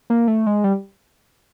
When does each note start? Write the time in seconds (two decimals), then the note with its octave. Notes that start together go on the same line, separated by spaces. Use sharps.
0.10 A#3
0.28 A3
0.46 G#3
0.64 G3